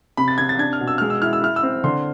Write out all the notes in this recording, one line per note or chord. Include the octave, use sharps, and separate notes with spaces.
C3 B5
A6
C3 G#6
A6
D4 G#6
F6
B2
E6
G#3 F6
E6
E4 F6
E6
E4 F6
E6
C4
D3 C6